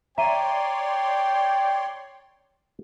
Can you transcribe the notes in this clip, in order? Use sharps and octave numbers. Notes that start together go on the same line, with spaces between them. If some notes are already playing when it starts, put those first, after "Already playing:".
C#5 D5 E5 G5 A#5 C6 D#7